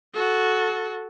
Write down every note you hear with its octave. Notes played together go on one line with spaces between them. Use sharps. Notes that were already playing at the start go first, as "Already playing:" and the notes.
F#4 A4